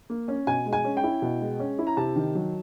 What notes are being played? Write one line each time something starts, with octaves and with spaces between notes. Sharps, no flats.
A#3
C#4
B2 G#5
G#3
G#5
C#4
G5
E4
B2
G#3
C#4
E4
A#5
C3 A5
D#3
F#3